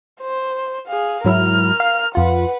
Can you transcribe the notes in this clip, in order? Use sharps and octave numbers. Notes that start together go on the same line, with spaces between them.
C5
G#4 F5
G#2 F#3 E4 A#4 F6
F5
F2 F4 B4 F#5